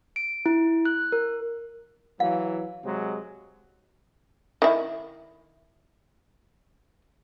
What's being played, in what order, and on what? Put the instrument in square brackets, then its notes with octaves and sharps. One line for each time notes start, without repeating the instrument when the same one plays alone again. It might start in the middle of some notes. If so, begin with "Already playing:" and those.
[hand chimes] D7
E4
F#6
A#4
[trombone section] E3 F#3 [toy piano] F5
[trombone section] C3 F#3 G#3
[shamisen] D#3 E4